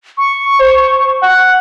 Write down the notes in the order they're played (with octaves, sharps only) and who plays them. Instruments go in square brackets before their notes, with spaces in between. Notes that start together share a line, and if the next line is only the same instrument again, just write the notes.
[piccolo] C#6
[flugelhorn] C5
F#5